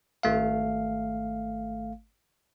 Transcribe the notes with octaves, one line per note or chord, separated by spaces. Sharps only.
G#1 A3 F5